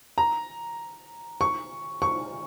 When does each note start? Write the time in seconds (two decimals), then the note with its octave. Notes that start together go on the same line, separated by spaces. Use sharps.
0.18 A#5
1.41 C#6
2.02 C#6